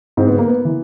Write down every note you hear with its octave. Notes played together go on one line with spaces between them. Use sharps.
G#2 C4
B3
A#3
B3
E3